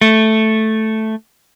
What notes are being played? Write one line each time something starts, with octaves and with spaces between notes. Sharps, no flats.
A3